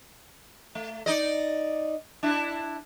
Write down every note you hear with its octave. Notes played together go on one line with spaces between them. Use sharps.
A3
D#4 D5 D#5
D4 E4